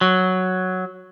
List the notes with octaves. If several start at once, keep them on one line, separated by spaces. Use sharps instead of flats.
F#3